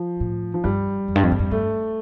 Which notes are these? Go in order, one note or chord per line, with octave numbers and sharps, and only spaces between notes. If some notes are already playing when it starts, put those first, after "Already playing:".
Already playing: F3
A2
F3
G2 G3
F2
G2
F2
G2
F2
G2 A3